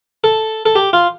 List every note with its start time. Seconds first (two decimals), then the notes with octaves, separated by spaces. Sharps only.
0.24 A4
0.66 A4
0.75 G4
0.93 F4